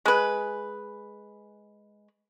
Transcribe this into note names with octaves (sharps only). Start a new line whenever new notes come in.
G#3 B4